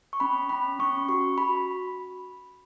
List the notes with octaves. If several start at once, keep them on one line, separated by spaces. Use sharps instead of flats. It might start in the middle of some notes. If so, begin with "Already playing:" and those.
C#6
C#4 B5
C#4 B5
C#4 C#6
F#4 C#6
F#4 B5